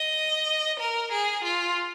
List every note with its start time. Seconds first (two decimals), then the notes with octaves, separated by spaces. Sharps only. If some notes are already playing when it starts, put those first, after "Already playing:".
Already playing: D#5
0.80 A#4
1.12 G#4
1.44 F4